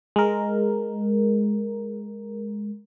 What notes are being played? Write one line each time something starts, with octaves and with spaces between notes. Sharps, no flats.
G#3 A#4